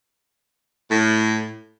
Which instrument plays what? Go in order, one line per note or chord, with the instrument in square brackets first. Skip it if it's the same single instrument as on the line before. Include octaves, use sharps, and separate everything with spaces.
[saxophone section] A2